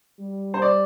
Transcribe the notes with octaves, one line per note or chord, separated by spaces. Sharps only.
G3
C5
D5